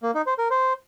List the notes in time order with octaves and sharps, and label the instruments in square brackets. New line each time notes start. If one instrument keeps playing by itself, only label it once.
[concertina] A#3
D#4
C5
A#4
C5